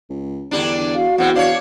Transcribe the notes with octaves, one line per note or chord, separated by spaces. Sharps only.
C#2
E2 D3 G3 D4
F#4 F5
E2 A2 C4 F#5
D4 C5 C#5 F5